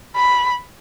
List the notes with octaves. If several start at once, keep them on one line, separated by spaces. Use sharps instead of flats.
B5